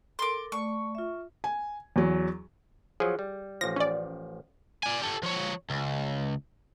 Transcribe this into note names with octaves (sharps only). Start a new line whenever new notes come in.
A4 A#4 C6 D6
A3 D5 C#6
F4 E5
G#5
E2 F#3
F3 F#3 G#4
G3
A1 F3 A#6
C#4 D5
D5 G#5
G4 A4
F3 C#5
C#2